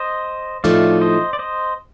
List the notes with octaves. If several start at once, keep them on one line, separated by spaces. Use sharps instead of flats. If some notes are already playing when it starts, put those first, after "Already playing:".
Already playing: C5 D#5
A2 F3 A3 D#4 D5 F5
C5 D#5
D5
C5 D#5